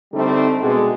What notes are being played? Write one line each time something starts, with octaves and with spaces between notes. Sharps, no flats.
D3 G3 A3 C4 D#4
B2 D3 G#3